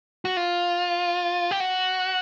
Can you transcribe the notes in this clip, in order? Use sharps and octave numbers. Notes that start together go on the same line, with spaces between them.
F#4
F4
G4
F#4